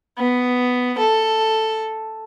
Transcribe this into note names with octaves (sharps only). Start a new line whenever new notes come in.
B3
A4